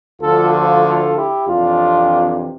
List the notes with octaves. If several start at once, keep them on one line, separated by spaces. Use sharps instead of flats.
D2 D3 F3 F4 A4
F4 A4
F4 A4
E4 G4
F2 C3 E3 D4 F4